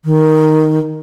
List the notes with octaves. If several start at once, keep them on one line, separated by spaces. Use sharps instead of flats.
D#3